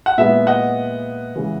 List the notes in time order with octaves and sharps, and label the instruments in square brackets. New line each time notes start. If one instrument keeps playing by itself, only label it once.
[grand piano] F#5
A#2 G#3 B3 E4 E5
D#5 F#5
C#3 E3 G#3